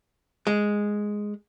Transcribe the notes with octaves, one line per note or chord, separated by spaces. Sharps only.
G#3